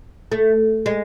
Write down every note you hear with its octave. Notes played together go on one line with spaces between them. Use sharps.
A3
G#3